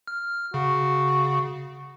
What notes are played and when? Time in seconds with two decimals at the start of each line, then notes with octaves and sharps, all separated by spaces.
0.07 F6
0.54 C#3 F#4